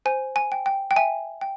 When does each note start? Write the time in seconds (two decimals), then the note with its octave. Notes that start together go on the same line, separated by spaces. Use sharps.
0.05 C5 G#5
0.36 G#5
0.52 G5
0.66 G5
0.91 G5
0.96 E5 G#5
1.41 G5